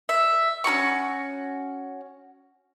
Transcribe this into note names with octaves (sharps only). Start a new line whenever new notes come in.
E5
C#4 E4 F#4 C#6